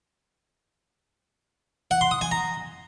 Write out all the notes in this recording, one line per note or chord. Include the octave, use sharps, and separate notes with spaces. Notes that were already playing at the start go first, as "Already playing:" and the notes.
F#5
C6
D#6
G#5
A#5